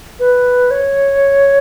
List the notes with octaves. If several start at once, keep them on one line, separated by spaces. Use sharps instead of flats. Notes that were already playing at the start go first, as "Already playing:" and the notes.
B4
C#5